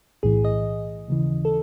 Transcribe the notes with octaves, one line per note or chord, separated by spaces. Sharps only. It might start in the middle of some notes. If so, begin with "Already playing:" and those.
B1 A2 E3 G#4
D#5
D#2 C#3 E3
A4